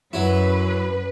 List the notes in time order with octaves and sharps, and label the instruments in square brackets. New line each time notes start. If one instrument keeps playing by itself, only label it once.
[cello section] F#2 B4 [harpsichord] F#3 E4